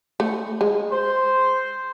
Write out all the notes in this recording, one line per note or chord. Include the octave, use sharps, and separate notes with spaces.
A3
G#3
C5